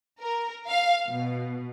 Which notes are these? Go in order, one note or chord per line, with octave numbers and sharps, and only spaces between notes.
A#4
F5
B2